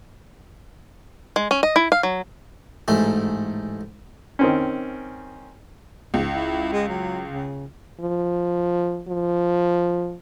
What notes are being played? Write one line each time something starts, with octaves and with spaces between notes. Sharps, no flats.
G#3
C#4
D#5
E4
F5
F#3
A1 G#2 A3
D#3 C4 C#4
C#2 G#2
E4
G#3
F#3
C#3
F3
F3